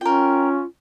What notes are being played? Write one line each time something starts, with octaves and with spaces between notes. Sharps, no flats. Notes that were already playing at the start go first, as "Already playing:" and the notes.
C#4 F4 A#4 G5